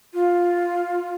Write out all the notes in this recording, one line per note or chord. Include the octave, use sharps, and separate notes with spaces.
F4